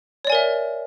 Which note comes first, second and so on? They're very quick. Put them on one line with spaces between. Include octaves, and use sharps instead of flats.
C#5 D5 G#5 A#4 E5